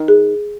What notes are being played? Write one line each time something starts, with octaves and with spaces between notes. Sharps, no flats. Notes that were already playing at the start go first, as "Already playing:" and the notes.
Already playing: D#3
G#4